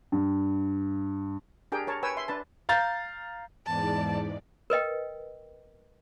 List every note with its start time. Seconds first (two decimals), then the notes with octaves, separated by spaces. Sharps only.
0.12 G2
1.72 D4 G4 G#4 A#4 G5
1.87 A#4 C#5 A5
2.03 B4 C#5 G5 G#5 E6
2.17 E5 C6
2.28 D4 B4 A5
2.69 F5 A#5 G6 A6
3.66 E2 G#2 D5 A5
4.70 A#4 B4 D#5 G5